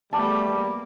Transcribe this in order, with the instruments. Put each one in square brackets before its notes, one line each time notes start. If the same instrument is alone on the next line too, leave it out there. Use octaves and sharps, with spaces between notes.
[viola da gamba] E2 A3 [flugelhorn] G3 [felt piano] A5 D6
[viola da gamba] A#3